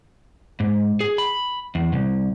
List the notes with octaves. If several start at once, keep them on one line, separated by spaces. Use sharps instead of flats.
G#2
G#4
B5
E2
C2